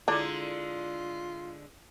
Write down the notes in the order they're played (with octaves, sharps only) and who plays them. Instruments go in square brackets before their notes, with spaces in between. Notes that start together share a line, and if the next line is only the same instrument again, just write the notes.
[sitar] D3 G#3 [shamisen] D4 [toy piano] E4 A4 D5 [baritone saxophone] F4